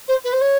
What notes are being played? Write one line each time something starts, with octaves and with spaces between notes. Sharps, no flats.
C5
B4
C5
C#5